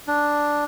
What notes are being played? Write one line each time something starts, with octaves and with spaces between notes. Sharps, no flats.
D4